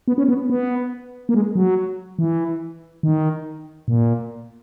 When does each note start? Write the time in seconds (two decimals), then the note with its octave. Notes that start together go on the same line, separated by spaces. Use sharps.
0.08 B3
0.18 C#4
0.29 B3
0.50 B3
1.29 A#3
1.34 G#3
1.56 F#3
2.19 E3
3.03 D#3
3.88 A#2